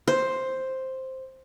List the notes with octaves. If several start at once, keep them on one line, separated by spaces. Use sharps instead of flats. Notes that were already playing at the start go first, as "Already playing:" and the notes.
C5